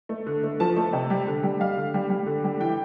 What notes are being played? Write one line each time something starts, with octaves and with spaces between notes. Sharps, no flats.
A3
D3
A3
F3 A5
A3
C3
G3
D3
G3
G3 F5
D3
G3
G3
D3
G3
E3 G5